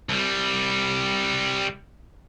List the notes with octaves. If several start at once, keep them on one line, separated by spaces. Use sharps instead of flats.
C2 G3